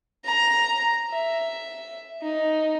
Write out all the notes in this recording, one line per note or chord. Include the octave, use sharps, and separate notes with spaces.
A#5
E5
D#4